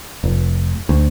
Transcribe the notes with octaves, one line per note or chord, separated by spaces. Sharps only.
F1
D2